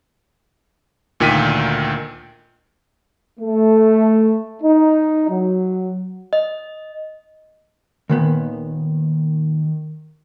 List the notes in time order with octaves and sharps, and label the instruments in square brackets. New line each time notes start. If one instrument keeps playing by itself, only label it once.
[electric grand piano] D2 A#2 D#3 G5 B6 D#7
[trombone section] A3
D#4
F#3
[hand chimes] D#5
[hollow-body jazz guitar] D#2 A#2 B3 [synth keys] D#3